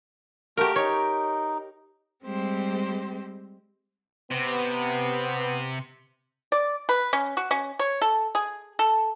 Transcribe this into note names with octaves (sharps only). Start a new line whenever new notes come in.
A3 F#4 G4 A#4
D#4 C#5
G3 G#3 C4 G4 C5
C3 B3
D5
B4
C#4
F#4
C#4
C#5
A4
G#4
A4